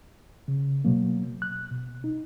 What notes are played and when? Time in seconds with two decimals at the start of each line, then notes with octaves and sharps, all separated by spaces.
0.48 C#3
0.85 B2 F#3 A#3
1.42 F#6
1.71 B2
2.04 D#4